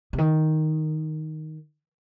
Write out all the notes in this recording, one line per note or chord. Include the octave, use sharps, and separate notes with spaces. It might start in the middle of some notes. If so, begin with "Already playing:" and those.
C3
D#3